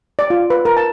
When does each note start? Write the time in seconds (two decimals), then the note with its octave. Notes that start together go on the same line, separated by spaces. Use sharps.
0.19 D5
0.30 F4
0.50 B4
0.65 A#4
0.77 A5